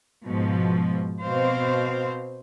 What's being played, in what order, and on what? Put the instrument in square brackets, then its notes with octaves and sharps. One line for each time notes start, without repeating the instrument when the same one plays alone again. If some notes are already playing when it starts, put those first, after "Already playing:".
[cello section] G#2 B2 F3
B2 C4 C5 F5